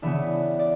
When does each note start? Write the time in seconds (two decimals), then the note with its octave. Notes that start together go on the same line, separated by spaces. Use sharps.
0.02 C#3 E3 B3 D4 E5
0.59 D5